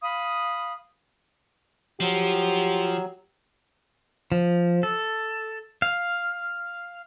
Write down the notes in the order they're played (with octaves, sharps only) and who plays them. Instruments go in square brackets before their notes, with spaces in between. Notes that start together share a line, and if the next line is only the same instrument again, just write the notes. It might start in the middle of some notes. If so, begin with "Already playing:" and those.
[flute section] F5 B5 D#6
[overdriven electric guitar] F3 [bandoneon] F#3 [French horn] G4
[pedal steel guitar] F3
A4
F5